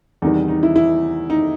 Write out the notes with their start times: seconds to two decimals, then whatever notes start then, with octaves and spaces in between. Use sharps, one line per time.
0.22 E2 C3 D#3 G3 D#4
0.48 D#4
0.63 E4
0.76 E4
1.30 D#4